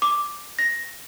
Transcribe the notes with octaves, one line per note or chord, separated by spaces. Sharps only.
D6
A#6